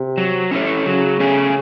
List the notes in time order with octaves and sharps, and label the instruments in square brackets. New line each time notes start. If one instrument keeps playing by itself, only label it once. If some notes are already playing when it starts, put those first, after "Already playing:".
Already playing: [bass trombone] C3
[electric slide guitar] F#3
C#4 E4 A4 C#5
[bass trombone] C#3 [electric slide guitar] F#3
[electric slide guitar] A3 C#4 G#4